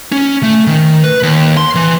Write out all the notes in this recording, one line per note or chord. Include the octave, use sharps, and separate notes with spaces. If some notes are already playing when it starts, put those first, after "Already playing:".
C#4
A3
D#3
B4
D#2
C6
E3